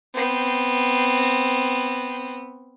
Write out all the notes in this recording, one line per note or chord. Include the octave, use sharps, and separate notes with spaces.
B3 C4